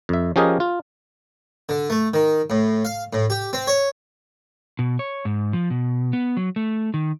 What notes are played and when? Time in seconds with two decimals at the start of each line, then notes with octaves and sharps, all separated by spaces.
0.09 F2 E5
0.36 F3 C#4 G4 G#4 A#4 D#5
0.60 F4
1.69 D3
1.90 A3
2.14 D#3
2.50 A2
2.85 F5
3.13 A2
3.30 G4
3.53 C4
3.67 C#5
4.79 B2
4.99 C#5
5.25 G#2
5.53 F3
5.70 B2
6.13 B3
6.37 F#3
6.56 A3
6.94 D#3